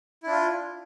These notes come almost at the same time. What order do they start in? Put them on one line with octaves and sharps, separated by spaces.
E4 D4 F4